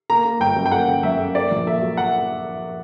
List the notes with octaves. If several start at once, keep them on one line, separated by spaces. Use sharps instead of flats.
A#3 A#5
A#3
G1 G5
F#2
G5
A#3 F#5
F#2
F#2 E5
A#3
A#3 D5
A#1
A#3 E5
F#3
A#3 F#5